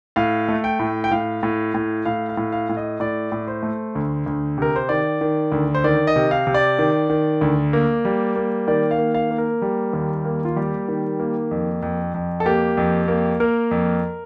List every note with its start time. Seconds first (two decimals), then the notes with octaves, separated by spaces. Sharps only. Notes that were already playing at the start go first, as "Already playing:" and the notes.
0.16 A2 F5
0.48 A3
0.64 G5
0.79 A2
1.04 G5
1.11 A2 F5
1.43 A2
1.74 A2
2.05 A2 F5
2.29 F5
2.37 A2
2.52 F5
2.69 A2
2.77 D#5
3.00 A2 D5
3.32 A2
3.48 C5
3.63 A3
3.95 D2
4.26 D2
4.58 C3 A#4
4.76 C5
4.89 D#3 D5
5.21 D#3
5.52 D2
5.75 C5
5.84 D#3 D5
6.07 D#5
6.16 C3
6.31 F5
6.47 C3
6.54 D5
6.79 D#3
7.10 D#3
7.41 D2
7.73 A#3
8.05 G3
8.36 A#3
8.67 D#3 D5
8.91 F5
8.98 A#3
9.14 F5
9.31 A#3
9.38 A#4
9.62 G3
9.93 D#2
10.25 A#3
10.45 F4
10.56 G3 G4
10.88 D#3
11.20 A#3
11.51 F2
11.83 F2
12.14 F2
12.40 A4
12.45 A#3 G4
12.77 F2
13.08 A#3
13.40 A#3 A#4
13.71 F2